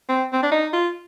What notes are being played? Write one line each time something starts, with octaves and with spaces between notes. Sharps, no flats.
C4
C4
D4
D#4
F4